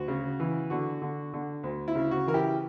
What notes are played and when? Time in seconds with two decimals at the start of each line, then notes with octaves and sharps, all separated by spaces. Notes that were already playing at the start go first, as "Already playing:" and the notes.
Already playing: D2 F#4
0.08 C#3
0.40 E3
0.70 D3 F#4
1.02 D3
1.33 D3
1.63 D2
1.88 E4
1.95 C#3
2.11 F#4
2.27 E3 A#4
2.34 E4 G4